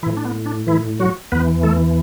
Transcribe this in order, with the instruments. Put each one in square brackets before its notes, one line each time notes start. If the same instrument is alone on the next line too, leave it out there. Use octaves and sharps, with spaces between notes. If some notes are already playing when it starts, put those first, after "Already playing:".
[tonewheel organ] E3 E4
A2
D4
B3
D4
E3 E4
F#3 F#4
E2 E3 B3 B4
A3 A4